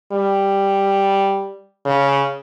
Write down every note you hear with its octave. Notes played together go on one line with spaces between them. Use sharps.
G3
C#3